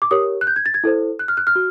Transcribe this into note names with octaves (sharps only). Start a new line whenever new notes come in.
D6
G4 A#4 C#5 D#6
F#6
G6
G#6
A6
G#6
E4 A4 C5
F#6
F6
F#6
F6
F#4